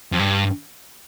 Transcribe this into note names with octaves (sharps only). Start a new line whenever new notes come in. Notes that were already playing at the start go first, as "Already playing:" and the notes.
F2
G2